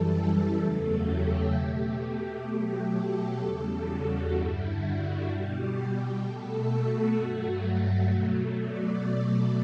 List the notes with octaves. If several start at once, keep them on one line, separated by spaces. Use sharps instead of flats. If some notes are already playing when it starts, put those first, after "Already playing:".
Already playing: F#2 E3 G3 A4
E2 C#3 F#3 A3 A4
G4
B2 A3
G4
B2 F#3 A3
A4
E2 C#3 G3 A4
F#4
G2 D3 G3 E4
F#4
B2 G3 G4
B2 A3 A4
F#4
G2 F#3 A3
F#4
B2 F#3 A3
D5